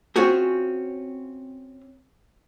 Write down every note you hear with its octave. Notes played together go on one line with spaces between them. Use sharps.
C4 C#4 F4 F#4 G#4